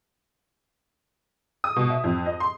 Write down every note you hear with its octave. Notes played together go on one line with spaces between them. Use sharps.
D#6
B2
E5
F2
D#5
C6